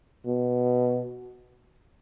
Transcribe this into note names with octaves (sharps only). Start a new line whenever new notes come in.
B2